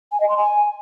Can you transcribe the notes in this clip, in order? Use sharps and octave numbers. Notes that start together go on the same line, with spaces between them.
G#5
D#5
C6
G#5